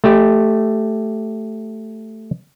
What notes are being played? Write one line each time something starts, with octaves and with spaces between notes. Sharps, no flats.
A3 G4